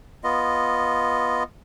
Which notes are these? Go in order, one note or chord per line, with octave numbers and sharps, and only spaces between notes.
B3 F4 D#5